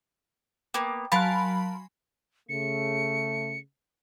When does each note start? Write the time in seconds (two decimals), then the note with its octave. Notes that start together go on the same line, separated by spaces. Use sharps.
0.74 A#3 B3 G5 D6
1.12 F#3 A#4 F5 G#5 A5 B5 C6 F#6
2.49 C#3 A3 C#7